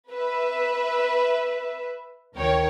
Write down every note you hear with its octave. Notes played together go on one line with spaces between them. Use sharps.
B4 E5
D2 D#3 A#4 C#5 G5